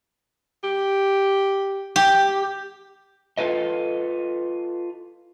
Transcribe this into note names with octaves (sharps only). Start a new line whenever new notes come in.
G4
G4
F4 A4 B4 D#5